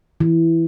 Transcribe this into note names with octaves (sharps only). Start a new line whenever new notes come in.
E3